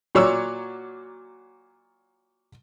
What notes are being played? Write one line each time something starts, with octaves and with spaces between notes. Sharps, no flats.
A#2 F#3 C#5 D5 E6